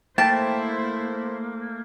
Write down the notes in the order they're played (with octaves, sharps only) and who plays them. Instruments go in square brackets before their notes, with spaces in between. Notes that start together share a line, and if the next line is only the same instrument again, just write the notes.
[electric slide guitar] A3 A#3 [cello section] E4 C5 [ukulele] G5 [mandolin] A5